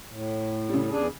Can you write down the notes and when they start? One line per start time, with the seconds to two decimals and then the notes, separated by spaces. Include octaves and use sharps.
0.09 A2
0.69 C#3 G3
0.90 E2 D4 G#4